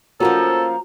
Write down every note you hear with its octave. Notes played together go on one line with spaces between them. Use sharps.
F3 A#3 C#4 F4 F#4 A4 C#5 A#5